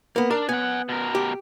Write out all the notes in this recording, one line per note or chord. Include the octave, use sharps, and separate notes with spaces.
A#3 B3
D4 A#4
B3 F#5 G#5
B2 A#4
G4